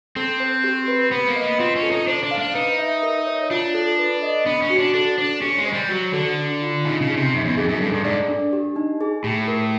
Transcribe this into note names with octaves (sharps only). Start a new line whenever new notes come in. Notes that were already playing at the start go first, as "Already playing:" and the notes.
C4 A4
C5
G4
B4
B3 B4
A#3
D#5
B3
C4 F4
C#4
A4
D#4
D4 C5
D4
F5
D4
D#4 B4
E5
A#4
C#5
D4 F4
A4
B4
D#5
B3 D4
C#4
F#4
D4
D4 A4
D4 C5
C#4 G4
G#3
C5
G3
F#3 F#4
D3 A4
D4
F4
C#3 D#4
C#3
G#4
C3
F#2 D#4
E2
F2 G#4
F#2
G2 A4
G2
G#2 D5
D4
G4
D#4
G#4
A2 G4
A#4